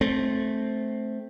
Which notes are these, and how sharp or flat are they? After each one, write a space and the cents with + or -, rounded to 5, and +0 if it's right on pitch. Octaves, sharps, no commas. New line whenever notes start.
A3 -10 C4 +0